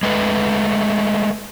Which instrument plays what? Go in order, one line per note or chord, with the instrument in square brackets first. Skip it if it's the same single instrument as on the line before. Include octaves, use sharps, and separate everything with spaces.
[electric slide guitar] G#3 A3 B4